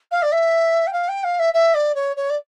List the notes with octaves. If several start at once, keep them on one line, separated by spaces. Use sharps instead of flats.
F5
D5
E5
G5
F5
G5
F5
E5
E5
D5
C#5
C#5
D5